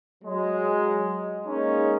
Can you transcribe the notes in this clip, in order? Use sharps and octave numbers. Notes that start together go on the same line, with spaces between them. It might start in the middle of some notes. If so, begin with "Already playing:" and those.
F#3 G#3
G#3 A#3 C#4 D#4